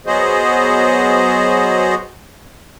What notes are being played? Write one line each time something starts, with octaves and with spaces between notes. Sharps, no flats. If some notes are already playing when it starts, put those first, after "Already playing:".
F#3 B3 F#4 G#4 C5 D#5